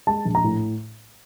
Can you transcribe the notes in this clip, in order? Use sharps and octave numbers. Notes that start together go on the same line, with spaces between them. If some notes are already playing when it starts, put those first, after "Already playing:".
G#3 A5
A#1
A#5
A2